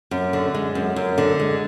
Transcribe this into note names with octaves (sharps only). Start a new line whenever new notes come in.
F#2
D3
G#3
F#2
F#2
D3
G#3